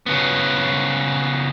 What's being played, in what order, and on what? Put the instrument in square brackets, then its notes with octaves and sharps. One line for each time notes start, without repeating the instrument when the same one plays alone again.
[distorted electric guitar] C#3 B3